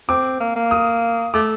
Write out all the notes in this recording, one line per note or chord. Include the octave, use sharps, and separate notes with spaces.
C4 D6
A#3
A#3
D#6
A3 D6